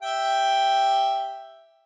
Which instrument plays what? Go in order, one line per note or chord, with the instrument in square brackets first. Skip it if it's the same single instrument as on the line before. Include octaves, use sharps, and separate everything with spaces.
[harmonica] G4 E5 G5